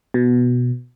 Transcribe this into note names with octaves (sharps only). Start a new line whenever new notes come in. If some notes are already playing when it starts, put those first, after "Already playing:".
B2